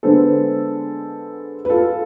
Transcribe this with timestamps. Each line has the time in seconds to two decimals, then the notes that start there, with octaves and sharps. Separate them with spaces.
0.03 D3 G#3 B3 D4 A4 C5
1.65 B4
1.69 F4 A4